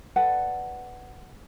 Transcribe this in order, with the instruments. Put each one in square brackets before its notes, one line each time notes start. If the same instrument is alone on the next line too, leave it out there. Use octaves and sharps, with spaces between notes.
[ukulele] A4 B4 D5 F#5